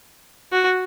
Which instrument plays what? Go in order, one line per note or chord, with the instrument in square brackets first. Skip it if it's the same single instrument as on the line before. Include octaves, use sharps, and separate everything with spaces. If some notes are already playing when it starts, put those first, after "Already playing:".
[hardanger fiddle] F#4